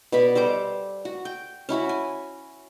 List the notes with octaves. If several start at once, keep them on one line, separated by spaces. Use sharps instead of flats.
B2 D5 B5 C#6
G3 A4 C5 D6
F#4
G5
C#4 E4 F#4 B5
G#5